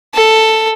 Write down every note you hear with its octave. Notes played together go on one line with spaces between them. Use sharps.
A4